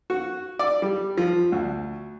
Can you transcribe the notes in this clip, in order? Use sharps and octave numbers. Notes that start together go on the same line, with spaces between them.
F#4
D5
G3
F3
D2